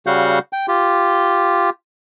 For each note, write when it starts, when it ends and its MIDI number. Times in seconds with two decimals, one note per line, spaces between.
0.07 0.39 49
0.07 0.39 55
0.07 0.39 66
0.07 0.39 77
0.07 0.39 78
0.07 0.39 91
0.53 0.66 79
0.68 1.70 65
0.68 1.70 67